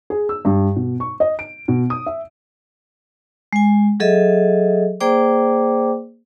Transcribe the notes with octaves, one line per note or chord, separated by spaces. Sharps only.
G#4
E6
G2
B2
C#6
D#5
D7
B2
D#6
E5
G#3 G#5
F#3 G#4 A4 D#5 E5
A#3 G#4 C5 D5 G5 D6